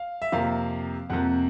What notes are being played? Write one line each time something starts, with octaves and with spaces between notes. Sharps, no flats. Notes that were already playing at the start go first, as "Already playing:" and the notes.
Already playing: F5
E5
F2 C3 F3 A#3 F5
F2 C3 F3 A#3 F#5